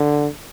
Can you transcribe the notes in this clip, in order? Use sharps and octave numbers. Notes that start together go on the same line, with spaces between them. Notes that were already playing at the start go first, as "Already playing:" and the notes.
Already playing: D3